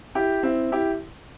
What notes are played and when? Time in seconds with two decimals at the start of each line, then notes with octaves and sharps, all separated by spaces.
0.15 E4 G4
0.43 C4 E4
0.72 E4 G4